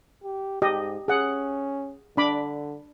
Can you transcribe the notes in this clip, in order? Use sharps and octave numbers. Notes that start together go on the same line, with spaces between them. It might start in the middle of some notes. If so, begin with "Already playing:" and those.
G4
G#2 G4 D#5
C#4 G#4 F#5
D3 D4 B5 D6